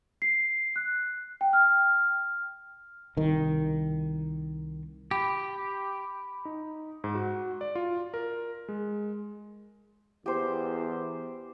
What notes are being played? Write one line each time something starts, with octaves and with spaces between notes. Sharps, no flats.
C7
F#6
G5
F6
C2 D#3
G4 B5
D#4
G#2
F#4
D5
F4
A#4
G#3
E2 G4 C5